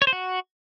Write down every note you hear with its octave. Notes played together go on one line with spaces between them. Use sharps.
C#5
C5
F#4